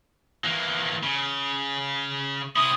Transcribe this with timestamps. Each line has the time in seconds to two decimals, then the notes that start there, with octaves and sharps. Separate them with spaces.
0.44 E3 A#3
1.03 C#3
2.56 C3 E4 D#6